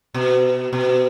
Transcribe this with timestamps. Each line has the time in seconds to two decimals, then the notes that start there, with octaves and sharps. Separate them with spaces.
0.14 B2
0.73 B2